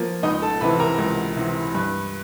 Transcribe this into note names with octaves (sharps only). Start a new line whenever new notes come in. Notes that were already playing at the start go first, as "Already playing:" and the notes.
Already playing: F3 A#3
C#2 D#4 D#5
A4 A5
C3 E3 B4 B5
A#4 A#5
C#2
C3 E3
G2